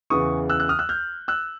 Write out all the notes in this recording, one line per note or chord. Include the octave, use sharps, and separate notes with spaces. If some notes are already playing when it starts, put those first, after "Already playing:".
E2 C#3 E3 C#6 D#6
E6 F#6
E6 F#6
D#6 F6
E6 F#6
F6 G6
E6 F#6